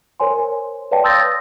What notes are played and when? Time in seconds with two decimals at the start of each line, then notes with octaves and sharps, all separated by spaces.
0.20 A#4 C5 C#5 G#5 C6
0.91 B4 C#5 D5 F5 G5 A5
1.04 C6 D#6 E6 G6 A6 A#6